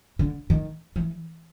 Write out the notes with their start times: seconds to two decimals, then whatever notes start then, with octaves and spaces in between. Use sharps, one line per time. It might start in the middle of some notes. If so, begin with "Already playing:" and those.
0.19 D3
0.50 D#3
0.96 E3